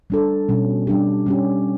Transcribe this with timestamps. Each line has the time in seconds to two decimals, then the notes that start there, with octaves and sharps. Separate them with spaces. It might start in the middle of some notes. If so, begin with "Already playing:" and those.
0.10 G3 D4 A4
0.49 B2 G3 C#4
0.87 G3 D4 G4
1.26 G3 C#4 G4